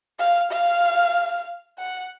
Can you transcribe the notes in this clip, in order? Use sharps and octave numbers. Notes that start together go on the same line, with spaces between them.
F5
F5
F#5